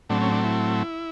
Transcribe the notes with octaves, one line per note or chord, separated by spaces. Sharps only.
A2 F#3 A3 C4 D4
C#4
D4
E4